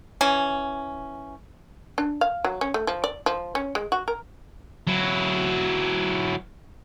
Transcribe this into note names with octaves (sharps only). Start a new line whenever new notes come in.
E3 C#4
D4
F5
F#3
C#4
A3
F3
D5
F3
C#4
G#3
F#4
A#4
F#3 E4